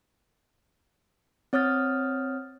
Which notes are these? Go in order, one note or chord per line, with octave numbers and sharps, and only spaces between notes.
C4 C#5 D#6 F6 A6